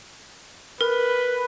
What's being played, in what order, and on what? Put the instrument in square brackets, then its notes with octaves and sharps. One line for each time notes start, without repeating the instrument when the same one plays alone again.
[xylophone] A#4 [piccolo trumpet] B4